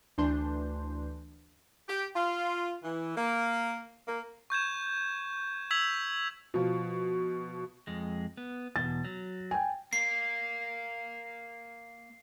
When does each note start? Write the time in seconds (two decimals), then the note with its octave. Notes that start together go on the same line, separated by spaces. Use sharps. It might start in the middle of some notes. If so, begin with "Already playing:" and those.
0.18 D2 E3 D4 C6 G6
1.87 G4
2.15 F4
2.83 E3
3.16 A#3
4.07 A#3
4.50 C#6 G6 G#6 E7
5.71 E6 G#6 B6 F7 F#7
6.54 B2 F3
7.87 F2 G#3
8.37 B3
8.76 E2 B2 A6
9.05 F#3
9.51 G5 G#5
9.93 A#3 C7